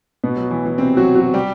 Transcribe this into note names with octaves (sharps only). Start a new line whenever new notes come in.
B2 B3
F#3
E3
E3
C3 C4
F#3 F#4
F#3 F#4
G3 G4